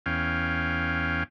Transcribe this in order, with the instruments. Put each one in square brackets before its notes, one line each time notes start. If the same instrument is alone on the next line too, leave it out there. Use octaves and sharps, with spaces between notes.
[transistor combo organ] E2 C#4 F5 G5